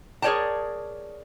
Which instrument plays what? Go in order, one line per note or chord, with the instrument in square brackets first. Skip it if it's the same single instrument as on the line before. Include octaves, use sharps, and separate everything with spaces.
[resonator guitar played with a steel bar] G#4 A#4 C#5 D5 G5 A5